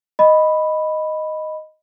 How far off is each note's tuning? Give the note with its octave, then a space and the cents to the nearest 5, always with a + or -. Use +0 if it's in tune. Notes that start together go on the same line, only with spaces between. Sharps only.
D#5 +0 B5 +0